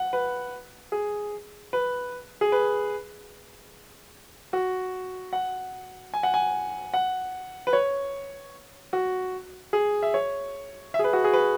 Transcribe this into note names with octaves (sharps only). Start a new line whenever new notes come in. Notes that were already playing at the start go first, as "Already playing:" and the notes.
Already playing: F#5
B4
G#4
B4
G#4
B4
F#4
F#5
G#5
F#5
G#5
F#5
B4
C#5
F#4
G#4
E5
C#5
E5
G#4
B4
F#4
G#4
B4